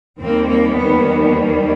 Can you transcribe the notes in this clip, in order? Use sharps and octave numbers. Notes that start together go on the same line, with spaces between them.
D#2 D#3 G3 A#3 C4
A#3
B3